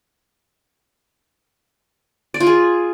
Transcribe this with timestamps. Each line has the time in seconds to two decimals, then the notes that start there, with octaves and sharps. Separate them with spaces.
2.34 D5
2.40 F4
2.47 G#4